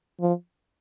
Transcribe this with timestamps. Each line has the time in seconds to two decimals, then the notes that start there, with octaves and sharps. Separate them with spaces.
0.21 F3